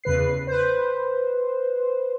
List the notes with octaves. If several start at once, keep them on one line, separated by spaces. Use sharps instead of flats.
E2 C#3 B4 C7
B4 C5